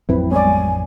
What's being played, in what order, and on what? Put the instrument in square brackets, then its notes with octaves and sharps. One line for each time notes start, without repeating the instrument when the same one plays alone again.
[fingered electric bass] A1 F2 F#3 [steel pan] C4 B4 [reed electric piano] E4
[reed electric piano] G3 G#3 B3 [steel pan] C#5 D5 [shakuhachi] G#5